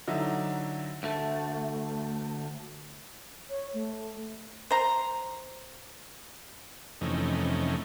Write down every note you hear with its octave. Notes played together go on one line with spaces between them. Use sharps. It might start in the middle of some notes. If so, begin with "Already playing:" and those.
D3 F#3 D#4 E4
D2 A3
C#5
A3
C5 A#5
F2 C3 E3 A3 C#4 D#4